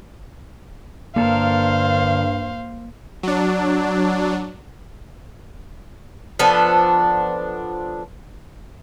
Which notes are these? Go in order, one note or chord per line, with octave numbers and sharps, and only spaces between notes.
G2 D3 A#3 A4 A#4 C5 F5
F#3 D4
F3 B3 D4 A4